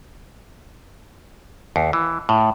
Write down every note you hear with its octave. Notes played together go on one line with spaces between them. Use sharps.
D#2
E3
A2